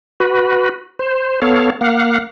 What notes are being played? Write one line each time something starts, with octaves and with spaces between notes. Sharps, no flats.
F#4 B4
C5
B3 A4 C#5 F5
A#3 F5 F#5